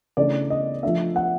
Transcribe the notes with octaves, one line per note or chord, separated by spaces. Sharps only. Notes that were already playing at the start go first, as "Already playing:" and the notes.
C#3 E3 A3 D4 D5
D#5
F3 A3 D4 E5
F#5